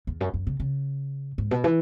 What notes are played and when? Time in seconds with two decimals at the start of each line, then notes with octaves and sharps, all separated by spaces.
0.07 E2
0.21 F#2
0.34 F#2
0.47 C#3
0.60 C#3
1.38 G#2
1.51 B2
1.64 E3